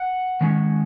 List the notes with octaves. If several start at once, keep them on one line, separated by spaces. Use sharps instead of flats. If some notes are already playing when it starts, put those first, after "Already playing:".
Already playing: F#5
D#3 G#3 C#4